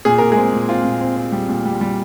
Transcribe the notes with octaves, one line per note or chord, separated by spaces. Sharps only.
A#2 G#4
A#2 A#4
G#3 G#4
C4
A#2
C4 F4
A#2
C4
C4
G3
A#2
G3
G3